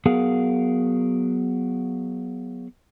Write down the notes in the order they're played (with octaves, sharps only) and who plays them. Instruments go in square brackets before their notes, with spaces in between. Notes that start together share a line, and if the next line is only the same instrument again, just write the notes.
[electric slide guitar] F#3 B3 G#4 A#4 F5 F#5